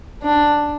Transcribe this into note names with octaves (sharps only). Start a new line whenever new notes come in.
D4